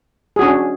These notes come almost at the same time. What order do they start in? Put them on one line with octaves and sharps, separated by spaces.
G#4 F#4 C#4 D4